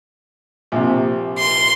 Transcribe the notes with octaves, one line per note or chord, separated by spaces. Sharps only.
A#1 C3
C6